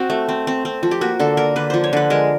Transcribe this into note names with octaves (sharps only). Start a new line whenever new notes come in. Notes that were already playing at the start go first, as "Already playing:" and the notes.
Already playing: C4 F#4
A3
C4
C4
C4
F3
G4
A#3 F#4
D3 A4
A#3 A#4
D3 B4
F3 C5
C#5
D3 B4
G#3 A#4